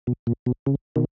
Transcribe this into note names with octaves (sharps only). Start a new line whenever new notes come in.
B2
A#2
B2
C#3
B2 D#3